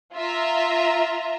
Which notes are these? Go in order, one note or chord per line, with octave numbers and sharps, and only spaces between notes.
F4 E5 A#5